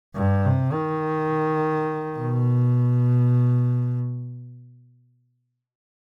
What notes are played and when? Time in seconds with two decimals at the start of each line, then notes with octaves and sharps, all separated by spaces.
0.15 G2
0.45 C3
0.73 D#3
2.16 B2